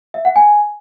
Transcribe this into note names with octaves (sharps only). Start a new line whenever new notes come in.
E5
F#5
G#5